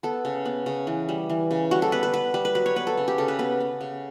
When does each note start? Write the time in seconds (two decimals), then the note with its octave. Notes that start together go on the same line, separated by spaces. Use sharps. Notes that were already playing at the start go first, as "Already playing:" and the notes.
0.03 B3 A4
0.25 C#3
0.45 B3
0.66 C#3
0.87 E3
1.09 G3
1.30 E3
1.51 C#3
1.71 G3 F#4
1.82 A4
1.92 B3 B4
2.03 B4
2.14 B3 B4
2.34 G3 B4
2.45 B4
2.55 F#3 B4
2.66 C#5
2.76 B3 B4
2.87 A4
2.97 C#3
3.08 G4
3.18 C#3 A4
3.28 B4
3.39 B3 B4
3.60 B3
3.81 C#3